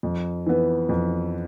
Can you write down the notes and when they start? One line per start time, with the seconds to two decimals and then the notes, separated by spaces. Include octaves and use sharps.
0.03 F2
0.46 E3 B3
0.89 F2